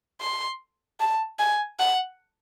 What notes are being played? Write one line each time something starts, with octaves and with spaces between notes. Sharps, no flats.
C6
A5
G#5
F#5